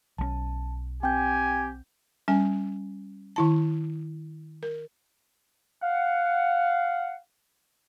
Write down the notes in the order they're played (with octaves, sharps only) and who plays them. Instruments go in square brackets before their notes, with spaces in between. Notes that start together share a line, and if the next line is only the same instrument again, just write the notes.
[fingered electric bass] B1 D#3 C#4 [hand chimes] A5
[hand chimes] C4 G6 [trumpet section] G4 G#5 [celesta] G5
[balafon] G3 C#4 G#5
D#3 E4 A5
A#4
[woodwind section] F5 F#5